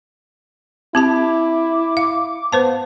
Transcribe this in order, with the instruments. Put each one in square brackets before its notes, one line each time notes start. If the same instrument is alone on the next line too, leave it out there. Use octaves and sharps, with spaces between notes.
[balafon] C4 G4 A5 [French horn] E4 [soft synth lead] D6
[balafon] F5
[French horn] B3 [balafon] B4 C5 A5 [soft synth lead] F5